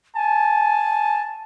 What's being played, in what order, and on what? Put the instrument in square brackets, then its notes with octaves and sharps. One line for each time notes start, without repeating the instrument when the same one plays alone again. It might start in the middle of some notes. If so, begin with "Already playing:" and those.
[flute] G#5 [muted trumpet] A5